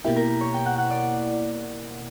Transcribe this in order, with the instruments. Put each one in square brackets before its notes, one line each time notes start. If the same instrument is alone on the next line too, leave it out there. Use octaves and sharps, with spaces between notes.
[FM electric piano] B2 A#3 E4 [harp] G4
[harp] A#4
C#5
G5
F#5
F#5
D5